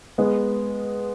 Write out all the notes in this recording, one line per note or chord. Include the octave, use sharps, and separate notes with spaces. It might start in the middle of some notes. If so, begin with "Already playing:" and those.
G#3 B3